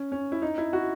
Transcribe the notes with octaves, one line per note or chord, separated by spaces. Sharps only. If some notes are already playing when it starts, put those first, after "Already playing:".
Already playing: C#4
C#4
E4
D#4
E4
F#4